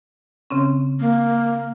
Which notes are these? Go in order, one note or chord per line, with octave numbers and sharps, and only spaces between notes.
C#3 C4 C#4
A#3